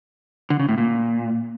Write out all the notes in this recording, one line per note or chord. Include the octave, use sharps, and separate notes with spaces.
D3
C#3
A2
A#2